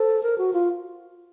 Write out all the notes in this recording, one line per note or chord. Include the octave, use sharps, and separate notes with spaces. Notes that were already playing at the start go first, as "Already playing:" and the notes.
Already playing: A4 C5
A#4
F#4
F4